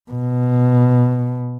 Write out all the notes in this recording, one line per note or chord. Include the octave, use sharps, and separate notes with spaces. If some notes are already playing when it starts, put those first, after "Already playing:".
B2